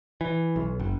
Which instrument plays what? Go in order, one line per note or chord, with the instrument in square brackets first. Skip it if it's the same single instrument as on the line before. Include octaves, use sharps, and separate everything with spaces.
[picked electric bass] E3
B1
F#1